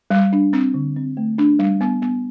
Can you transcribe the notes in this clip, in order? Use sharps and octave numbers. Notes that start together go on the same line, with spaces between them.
G3
D4
C4
D3
C4
A3
D4
G3
B3
B3